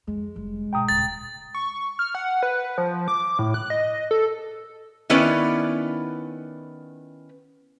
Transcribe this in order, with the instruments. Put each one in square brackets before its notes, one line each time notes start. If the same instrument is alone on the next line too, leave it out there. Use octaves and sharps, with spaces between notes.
[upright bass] F2 [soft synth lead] G#3
[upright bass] F1 G3
[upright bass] B2 D#4 [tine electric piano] G5 A#5 D#6
[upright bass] D#1 C#3 [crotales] A6
[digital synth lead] C#6
F6
F#5
B4
F3
D6
A2
F#6
D#5
A4
[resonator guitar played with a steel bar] D#3 B3 C#4 E4 B4 D5